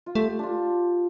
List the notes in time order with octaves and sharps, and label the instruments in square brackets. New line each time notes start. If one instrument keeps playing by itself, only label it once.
[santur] F4
[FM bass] A3 [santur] G4
[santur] D4 F4